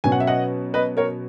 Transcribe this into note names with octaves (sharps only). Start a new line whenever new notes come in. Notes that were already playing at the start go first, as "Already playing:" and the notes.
B2 F#3 C#4 G#5
F#5
E5
D#5 F#5
B4 D#5
A#4 C#5